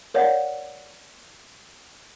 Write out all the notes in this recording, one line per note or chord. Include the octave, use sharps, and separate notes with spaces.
A#4 C#5 D5 F5 F#5